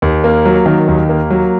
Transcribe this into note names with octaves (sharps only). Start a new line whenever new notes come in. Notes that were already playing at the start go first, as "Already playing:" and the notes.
D#2
A#3
F#3
D#3
D#2
A#3
F#3